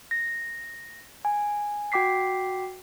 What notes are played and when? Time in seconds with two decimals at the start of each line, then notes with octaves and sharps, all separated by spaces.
0.11 A#6
1.25 G#5
1.92 F#4 G5 D6 B6 C7